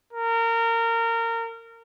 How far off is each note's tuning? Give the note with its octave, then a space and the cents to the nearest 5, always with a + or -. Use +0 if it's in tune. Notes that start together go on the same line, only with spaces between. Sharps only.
A#4 -25